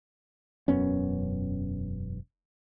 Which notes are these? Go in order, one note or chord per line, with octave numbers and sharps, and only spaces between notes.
E1 F#2 B3 C#4